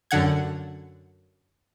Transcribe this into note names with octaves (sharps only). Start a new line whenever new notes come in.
F#2 D3 F#5 G#6